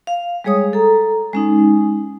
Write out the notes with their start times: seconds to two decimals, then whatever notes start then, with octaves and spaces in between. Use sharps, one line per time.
0.07 F5
0.44 G3 G#3 G#4 C#5 D#6
0.73 A4 A#5
1.33 G#3 C#4 D#4